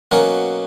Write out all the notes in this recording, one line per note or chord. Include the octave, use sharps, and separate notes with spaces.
B2 F#3 A#3 C#4 A#4